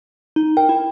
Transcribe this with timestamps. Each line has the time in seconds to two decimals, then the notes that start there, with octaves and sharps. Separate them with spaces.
0.36 D#4
0.57 A#4 G5
0.69 E4